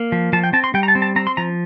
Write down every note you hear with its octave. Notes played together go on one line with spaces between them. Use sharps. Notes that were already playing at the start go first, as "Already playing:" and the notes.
Already playing: A#3
F3
F3 A5
G5
C4 A5
C6
G3 G5
A#5
A5
C4
A5
C4 A#5
C6
F3 A#5